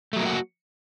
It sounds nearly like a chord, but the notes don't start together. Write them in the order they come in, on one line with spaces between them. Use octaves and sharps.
A3 F#3 A#3 E4 F#4